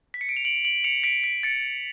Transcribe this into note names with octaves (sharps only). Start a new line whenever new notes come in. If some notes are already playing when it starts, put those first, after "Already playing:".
B6
C#7
D7
F7
D7 F#7
D7 F#7
C#7 F7
B6 D7
B6
A6 C#7